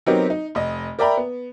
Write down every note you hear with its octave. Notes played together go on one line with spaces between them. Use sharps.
F#3 B3 C4 D#4 G4 A#4
D#4
F1 D#5
A#4 D5 E5 G5 A#5 B5
B3